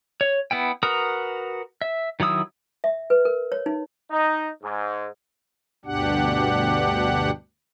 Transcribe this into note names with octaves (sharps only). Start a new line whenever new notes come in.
C#5
B3 E4 G5
F#4 A#4 B4 A#5 D#6
E5
D#3 F#3 E4 D#6 E6
E5
B4
A#4
C#5
D#4
D#4
G#2
D2 G2 B2 D4 G4 F#5